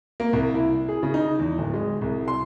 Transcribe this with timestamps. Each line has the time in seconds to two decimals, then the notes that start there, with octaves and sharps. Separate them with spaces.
0.20 A#3
0.33 C2
0.55 E4
0.89 G#4
1.03 C#3
1.14 D#4
1.39 E2
1.58 D1
1.74 G#3
2.02 C2
2.28 C6